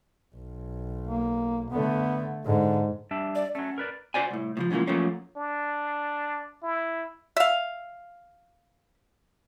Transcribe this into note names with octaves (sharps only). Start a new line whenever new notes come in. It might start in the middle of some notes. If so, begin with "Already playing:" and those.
B1
A#3
D3 A3 B3
G#2 D3
G3 D4 E5
D5
F#3 A3 C#4
A#4 B4 D5
F#4 A4 C5 D5 G#5
C2 A2
A2 C#3 F3
G#2 C#3 E3 F3 A#3
F3 F#3 A3 A#3 C#4
D4
E4
E5 F5